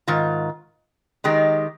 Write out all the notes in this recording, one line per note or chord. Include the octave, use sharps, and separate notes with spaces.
G#2 D#3 F4
D#3 G#3 D#4 G4